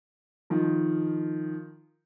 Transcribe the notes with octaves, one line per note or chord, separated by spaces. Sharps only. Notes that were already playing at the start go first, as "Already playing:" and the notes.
D#3 F3